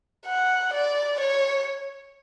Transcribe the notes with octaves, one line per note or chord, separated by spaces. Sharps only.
F#5
D5
C#5